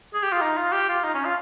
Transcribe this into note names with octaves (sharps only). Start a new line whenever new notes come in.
G#4
G4
F4
D#4
F4
G4
F4
D#4
C#4
F4